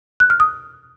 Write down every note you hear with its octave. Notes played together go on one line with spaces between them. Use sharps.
F#6
F6
D#6